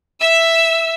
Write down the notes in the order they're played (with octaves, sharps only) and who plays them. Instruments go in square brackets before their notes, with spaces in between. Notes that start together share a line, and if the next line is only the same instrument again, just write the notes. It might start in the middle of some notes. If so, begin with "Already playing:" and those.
[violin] E5 E6